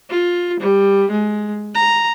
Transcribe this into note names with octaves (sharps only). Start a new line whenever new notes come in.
F4
G3
G#3
A#5